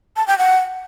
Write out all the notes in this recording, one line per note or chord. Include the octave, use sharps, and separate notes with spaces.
A5
G5
F#5